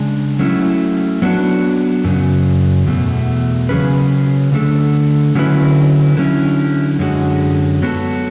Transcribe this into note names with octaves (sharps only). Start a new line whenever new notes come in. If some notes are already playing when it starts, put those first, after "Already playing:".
Already playing: C#3 G#3 D4
F#3 A3 C#4 E4
F#3 B3 D4 F#4
F#2 C#3 F#3
E2 B2 A3
C#3 F#3 C#4 G#4 B4
D3 A3 D4 A4
D3 F#3 C#4 E4 B4
D3 F#3 C#4 E4
F#2 D3 G#3 C#4 F#4
F#3 B3 F#4 A4